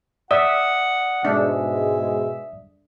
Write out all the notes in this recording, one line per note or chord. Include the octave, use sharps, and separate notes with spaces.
D5 E5 F#5 D#6
G#2 B2 G#3 D4 E5